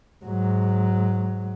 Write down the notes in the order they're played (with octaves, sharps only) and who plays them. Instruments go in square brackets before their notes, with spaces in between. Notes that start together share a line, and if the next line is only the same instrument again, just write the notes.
[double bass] G#2 F#3